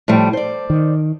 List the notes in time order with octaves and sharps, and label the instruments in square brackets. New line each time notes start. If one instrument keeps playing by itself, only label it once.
[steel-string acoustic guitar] A2 F3 G3
C5 D5
[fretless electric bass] D#3